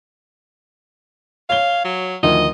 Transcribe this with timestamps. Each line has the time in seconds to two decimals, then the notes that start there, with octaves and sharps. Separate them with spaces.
1.50 C#5 F5 G7
1.85 F#3
2.23 D2 D#3 F3 D#5